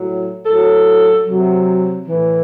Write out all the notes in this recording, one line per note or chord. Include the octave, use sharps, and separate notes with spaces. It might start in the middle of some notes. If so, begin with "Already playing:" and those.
Already playing: A2 F#3
A2 F#3 A4
C3 F#3
A2 E3